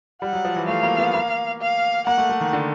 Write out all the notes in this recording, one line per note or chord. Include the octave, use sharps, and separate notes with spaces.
G3 F#5
F#3
F3
E3
A3 F5
A#3
B3
A#3
F5
A#3 F#5
A3
A3
D#3
D3